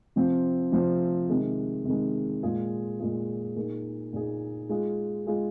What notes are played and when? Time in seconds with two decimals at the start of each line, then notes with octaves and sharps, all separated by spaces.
0.16 C3 F3 C4
0.72 C3 F3 C4
1.29 C3 D#3 G#3
1.85 C3 D#3 G#3
2.43 A#2 G#3 F4 G#4
3.00 A#2 G#3 F4 G#4
3.56 A#2 A#3 D#4 G#4
4.13 A#2 A#3 D#4 G#4
4.69 G#3 F4 G#4
5.27 G#3 F4 G#4